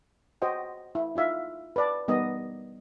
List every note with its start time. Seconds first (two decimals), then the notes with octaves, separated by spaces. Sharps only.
0.42 F#4 C5 D#5 G5
0.95 E4
1.16 D#4 F4 E5 F5
1.76 B4 D5 A5
2.08 G3 B3 D#4 A#4 D#5